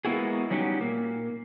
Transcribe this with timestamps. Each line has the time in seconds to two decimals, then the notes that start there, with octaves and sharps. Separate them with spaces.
0.05 G#3 A#3 B3 E4 F#4 G#4
0.50 F#3 G3 C#4 D#4 F#4 G4
0.81 A#2 A#3